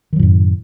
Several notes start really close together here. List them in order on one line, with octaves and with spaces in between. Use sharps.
D#3 F#3 A2 F#2